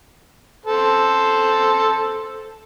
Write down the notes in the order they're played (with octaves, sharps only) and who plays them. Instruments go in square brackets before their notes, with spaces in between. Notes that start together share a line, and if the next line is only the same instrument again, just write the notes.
[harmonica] A4 C5